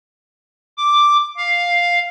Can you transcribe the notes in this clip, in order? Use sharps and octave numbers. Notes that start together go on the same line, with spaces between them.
D6
F5